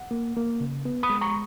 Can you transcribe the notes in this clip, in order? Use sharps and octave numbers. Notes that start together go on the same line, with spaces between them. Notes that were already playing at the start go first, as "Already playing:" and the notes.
Already playing: F#5
A#3
A#3
C#3
B3
B5 D#6
G#3
A#5 C#6